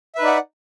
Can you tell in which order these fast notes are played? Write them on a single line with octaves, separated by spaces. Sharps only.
E5 B4 D#4 D5 F#5